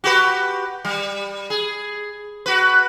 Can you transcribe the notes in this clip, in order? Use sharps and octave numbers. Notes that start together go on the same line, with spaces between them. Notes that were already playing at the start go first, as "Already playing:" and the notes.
F#4 G4 B4
G3
G#4
F#4 B4